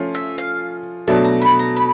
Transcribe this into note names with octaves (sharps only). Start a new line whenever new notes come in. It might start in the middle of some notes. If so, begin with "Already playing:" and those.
Already playing: F3 A3 C#4 F4
E5
F5
B2 F#3 A3 D4 A5
A#5
B5
A#5
B5